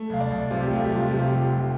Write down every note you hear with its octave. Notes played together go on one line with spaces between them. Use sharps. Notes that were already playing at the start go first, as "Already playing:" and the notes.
Already playing: A3
C2 F5
D5
C2
C3 F4
G4
A3 F4
G4
C2
F4
C3 G4
F4
F1 G4
F4
F1